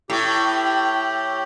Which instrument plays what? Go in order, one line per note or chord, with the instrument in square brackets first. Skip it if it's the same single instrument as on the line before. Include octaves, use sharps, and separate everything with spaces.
[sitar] A2 [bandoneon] G4